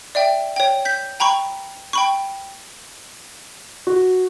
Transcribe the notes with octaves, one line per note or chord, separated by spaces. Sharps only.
D5 E5 G5
C#5 G5
G6 B6
G5 A#5 B5 C#6
G5 B5 C#6
F#4